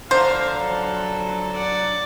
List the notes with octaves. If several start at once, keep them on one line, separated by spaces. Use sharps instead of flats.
D3 F3 D4 C5 E5 F5 A#5
F#3 A4
D5 F#5